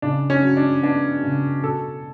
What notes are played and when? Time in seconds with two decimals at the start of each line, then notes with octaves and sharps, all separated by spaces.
0.02 C#3 D4
0.30 C#4
0.43 F#3
0.57 D4
0.83 B3 D4
1.23 C#3
1.64 B2 A4